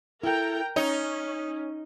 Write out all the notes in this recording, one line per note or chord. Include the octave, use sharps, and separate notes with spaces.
E4 A4 A#4 G5 A#5
C#4 D#4 C#5 A#5